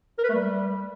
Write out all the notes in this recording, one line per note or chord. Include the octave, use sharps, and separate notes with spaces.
A#4
B4
A3
G3